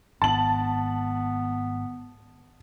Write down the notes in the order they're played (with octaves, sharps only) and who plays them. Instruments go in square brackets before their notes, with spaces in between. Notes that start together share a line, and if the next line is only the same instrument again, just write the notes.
[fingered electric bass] G#1 [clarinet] B3 [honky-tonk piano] A5 F#7